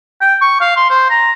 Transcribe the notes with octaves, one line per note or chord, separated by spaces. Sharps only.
G5
C#6
F5
C6
C5
A#5